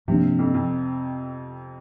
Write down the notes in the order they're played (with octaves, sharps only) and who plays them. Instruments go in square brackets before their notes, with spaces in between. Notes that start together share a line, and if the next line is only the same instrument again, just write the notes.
[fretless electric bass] G2 F3 A#3 D4 [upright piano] C3
[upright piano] F2
F2